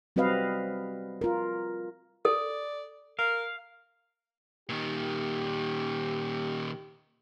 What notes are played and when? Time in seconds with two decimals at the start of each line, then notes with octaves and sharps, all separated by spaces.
0.16 G3 C4 F#4 B4 D#5 F5
1.21 F4 A#4
2.25 A4 D5
3.19 A#4 F5
4.69 A#2 D#3 G4